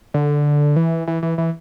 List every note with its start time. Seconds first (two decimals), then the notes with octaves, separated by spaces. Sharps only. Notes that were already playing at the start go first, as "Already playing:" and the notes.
0.14 D3
0.76 E3
1.07 E3
1.23 E3
1.38 E3